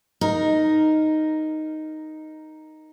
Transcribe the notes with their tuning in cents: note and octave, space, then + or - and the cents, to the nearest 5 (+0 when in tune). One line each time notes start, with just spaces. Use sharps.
D#4 +0 A#4 +0